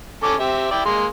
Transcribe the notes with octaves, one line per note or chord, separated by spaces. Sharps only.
C#4 A4 D6
C4 G4 E5
E4 D5 G5
G#3 A#3 C6